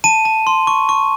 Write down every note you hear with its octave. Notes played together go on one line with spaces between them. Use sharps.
A5 D#7
A5
C6
C#6
C#6